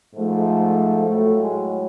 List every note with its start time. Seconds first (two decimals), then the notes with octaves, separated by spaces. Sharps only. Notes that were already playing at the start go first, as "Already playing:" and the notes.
0.15 G#2 F3 A3
1.07 A2 F#3 A3
1.38 G#3